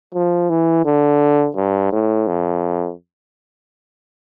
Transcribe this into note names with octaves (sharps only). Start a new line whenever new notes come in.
F3
E3
D3
G2
A2
F2